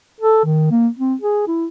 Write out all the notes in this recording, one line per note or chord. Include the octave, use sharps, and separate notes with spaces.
A4
D#3
A#3
C4
G#4
E4